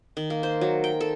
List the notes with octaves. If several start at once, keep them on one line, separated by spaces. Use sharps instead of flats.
D#3
A#3
C5
F#3
G5
A4